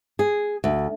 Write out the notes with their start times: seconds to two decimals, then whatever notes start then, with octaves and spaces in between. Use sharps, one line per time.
0.19 G#4
0.64 D2